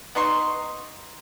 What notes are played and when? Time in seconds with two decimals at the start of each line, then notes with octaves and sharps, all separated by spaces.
0.15 B3 D#4 C6 C#6